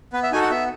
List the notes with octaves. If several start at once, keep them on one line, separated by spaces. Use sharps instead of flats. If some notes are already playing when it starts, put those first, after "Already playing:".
B3 B4
E5
D#4 F#4 A4 G#5
F#5
B3 E5